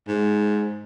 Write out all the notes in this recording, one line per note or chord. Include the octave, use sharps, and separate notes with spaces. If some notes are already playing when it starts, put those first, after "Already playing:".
G#2